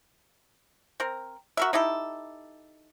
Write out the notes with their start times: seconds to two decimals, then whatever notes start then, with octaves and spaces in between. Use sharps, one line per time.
1.00 C4 A#4
1.57 F#4 A#4 E5
1.73 D#4 E4 G4 A4